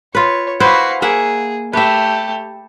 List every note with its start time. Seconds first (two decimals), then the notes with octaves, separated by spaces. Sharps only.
0.15 F4 B4 C#5
0.60 E4 F#4 B4 C5 F5
1.02 A#3 G#4 E5 F#5
1.73 A3 G4 B4 E5